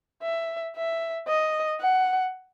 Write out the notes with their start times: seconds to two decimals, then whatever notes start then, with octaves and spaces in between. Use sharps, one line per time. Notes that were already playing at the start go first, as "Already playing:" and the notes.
0.23 E5
0.76 E5
1.28 D#5
1.80 F#5